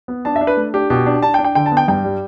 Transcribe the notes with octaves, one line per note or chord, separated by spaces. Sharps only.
B3
D4 A5
E5
D4
B4
A3
D4 G4
B2 G4
D4
D4 A5
G5
D4
G5
D3 G5
A5
B3
G5
G2 G5
G3